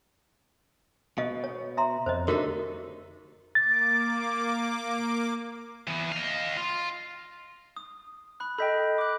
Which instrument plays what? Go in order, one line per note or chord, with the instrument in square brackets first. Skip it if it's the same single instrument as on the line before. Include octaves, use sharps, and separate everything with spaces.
[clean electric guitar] B2 [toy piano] D#5 F5
[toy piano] C#5
E5 A#5 C6
[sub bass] F2 [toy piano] C5 C#5 D#5
[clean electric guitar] D3 A3 D#4 [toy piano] F#4 G4 A#4
[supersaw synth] A#3 D6 [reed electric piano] A6
[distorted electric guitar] E3 B3
D#5 F5
F4
[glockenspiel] D#6
B5 F#6
[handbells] A4 D#5 G5 [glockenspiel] B5 G6 B6
[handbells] D6 F#6